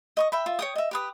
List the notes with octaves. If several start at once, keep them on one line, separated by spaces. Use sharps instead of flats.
D#5 C#6 D#6
E5 G5 B5
F4 E5
C#5 G5 D#6
D#5 E5
G4 B4 D#6